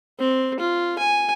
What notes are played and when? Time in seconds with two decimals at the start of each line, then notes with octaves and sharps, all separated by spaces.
0.19 C4
0.60 F4
0.99 G#5